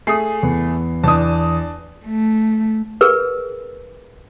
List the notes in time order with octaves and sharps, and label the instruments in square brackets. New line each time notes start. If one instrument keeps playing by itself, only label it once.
[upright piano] A3 G#4 [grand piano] D#6 C7
[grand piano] E2 B3
[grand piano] E2 D#6 [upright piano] D4 A5
[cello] A3
[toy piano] G#4 A#4 B4